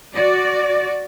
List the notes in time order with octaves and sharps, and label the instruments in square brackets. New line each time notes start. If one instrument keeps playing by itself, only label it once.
[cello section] F#4 D5